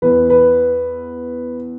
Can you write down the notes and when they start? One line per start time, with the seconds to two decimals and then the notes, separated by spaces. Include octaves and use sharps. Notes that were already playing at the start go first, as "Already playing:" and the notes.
0.02 E2 E3 B4
0.30 B4